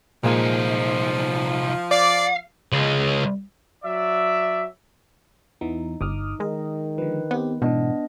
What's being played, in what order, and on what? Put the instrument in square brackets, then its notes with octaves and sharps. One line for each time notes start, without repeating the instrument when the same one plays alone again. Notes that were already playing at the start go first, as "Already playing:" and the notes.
[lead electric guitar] C2 D#4 [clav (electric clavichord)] A#2 G#3 A#3 [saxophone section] F3
[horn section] D5 [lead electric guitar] F5
[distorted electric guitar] C#2 G#3
[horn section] F#3 D5 E5
[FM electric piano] E2 E3 B3 [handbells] D#4
[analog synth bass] G1 [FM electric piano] D6 D#6 F6
[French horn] D#3 [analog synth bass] G#3 [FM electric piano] A#4 D#5
[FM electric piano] D3 F3 [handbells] B4
[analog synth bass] B3 [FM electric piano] C4 G4
[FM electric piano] G#2 E3 [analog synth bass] B2 [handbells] B3 D4 D#5